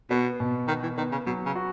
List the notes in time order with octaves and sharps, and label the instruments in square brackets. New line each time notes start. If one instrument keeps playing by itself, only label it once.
[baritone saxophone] B2 [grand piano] B3
[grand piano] B2
[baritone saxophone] D#3 [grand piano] B3
[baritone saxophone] E3
[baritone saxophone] D#3 [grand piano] B3
[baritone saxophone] C#3
[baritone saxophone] B2 [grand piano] F#3
[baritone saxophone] C#3
[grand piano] F#4